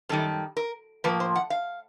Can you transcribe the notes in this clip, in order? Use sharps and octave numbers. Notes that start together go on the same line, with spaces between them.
F#2 D#3 G3 A4
A#4
A2 F3 A#3 B4
C5
F#5
F5